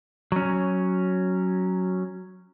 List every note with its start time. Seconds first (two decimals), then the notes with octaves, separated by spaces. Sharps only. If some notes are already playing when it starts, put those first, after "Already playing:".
0.32 F#3 C#4